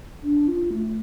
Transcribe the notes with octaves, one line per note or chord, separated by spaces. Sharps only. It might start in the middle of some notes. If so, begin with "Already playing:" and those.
D4
F4
A3